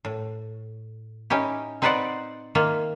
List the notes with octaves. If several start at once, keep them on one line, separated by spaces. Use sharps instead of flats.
A2
C#4 D#4 E4 G4
C4 D#4 B4 C5 D5 F#5
D#3 A#3 F4 E5